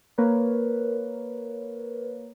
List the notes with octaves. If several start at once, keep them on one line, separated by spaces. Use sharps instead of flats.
A#3 A#4 B4 C#5